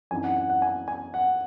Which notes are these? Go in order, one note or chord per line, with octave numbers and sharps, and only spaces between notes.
F#2 E3 C4 D#4 G#5
F#5
F#5
F#5
G#5
G#5
F#5